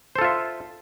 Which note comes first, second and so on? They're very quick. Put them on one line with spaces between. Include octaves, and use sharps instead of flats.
C5 A4 F4 E5